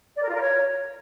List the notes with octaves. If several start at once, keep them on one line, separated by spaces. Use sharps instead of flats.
D5
A#4
F4
A#4
C#5